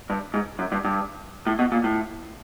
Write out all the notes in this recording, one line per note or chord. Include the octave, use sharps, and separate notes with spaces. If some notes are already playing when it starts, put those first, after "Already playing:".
G2
G#2
F#2
G2
G2
A2
B2
A#2
A2